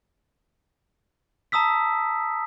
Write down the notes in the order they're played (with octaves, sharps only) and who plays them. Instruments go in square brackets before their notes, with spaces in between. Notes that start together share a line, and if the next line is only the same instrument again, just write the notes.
[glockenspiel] A5 A#5 D#6 E6 B6